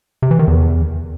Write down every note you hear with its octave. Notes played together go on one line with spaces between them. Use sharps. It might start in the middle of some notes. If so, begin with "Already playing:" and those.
C3
E3
D#3
E2